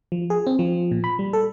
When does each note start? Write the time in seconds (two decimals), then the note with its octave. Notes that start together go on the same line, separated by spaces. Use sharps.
0.12 F3
0.30 G#4
0.47 C4
0.59 F3
0.91 A#2
1.04 B5
1.19 G3
1.33 A4